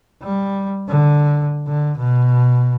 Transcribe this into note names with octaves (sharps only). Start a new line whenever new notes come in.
G3
D3
D3
B2